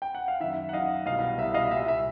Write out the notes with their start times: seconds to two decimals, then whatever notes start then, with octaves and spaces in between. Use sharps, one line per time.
0.02 G5
0.15 F#5
0.28 F5
0.40 F#2 D#3 E5
0.69 F#5
0.73 F#2 D#3 D#5 F5
1.06 C2 B2 D#5 F5
1.38 C2 B2 E5
1.54 D#5 F5
1.71 C2 A#2 E5
1.88 E5